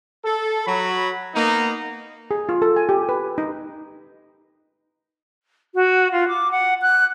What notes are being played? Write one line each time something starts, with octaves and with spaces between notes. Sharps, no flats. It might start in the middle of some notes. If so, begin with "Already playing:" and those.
A4
F#3 B5
A#3 B3 D#4
G#4
F4
A4
G#5
G4
B4
D#4
F#4
F4
D6
F#5
F#6